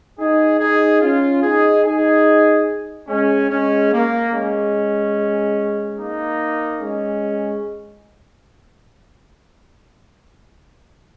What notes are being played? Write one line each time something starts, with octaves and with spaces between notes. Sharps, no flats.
D#4 G#4
D#4 G#4
C#4 F4
D#4 G#4
D#4 G#4
G#3 C#4
G#3 C#4
A#3
G#3 C#4
A#3 D#4
G#3 C#4